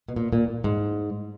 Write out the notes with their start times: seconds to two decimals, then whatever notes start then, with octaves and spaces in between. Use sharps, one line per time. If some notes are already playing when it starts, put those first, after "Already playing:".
0.09 B2
0.16 A#2
0.33 A#2
0.64 G#2